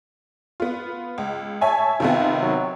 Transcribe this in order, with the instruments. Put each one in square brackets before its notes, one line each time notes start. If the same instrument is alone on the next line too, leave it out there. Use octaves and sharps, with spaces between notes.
[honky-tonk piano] B3 F4
C#2
[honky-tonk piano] C#5 E5 G#5 [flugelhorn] A5
[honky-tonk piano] C3 D#3 B3 [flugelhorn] F4
[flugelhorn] F#3